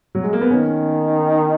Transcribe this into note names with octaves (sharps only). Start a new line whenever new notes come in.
F#3
G#3
A#3
B3
D#3 C#4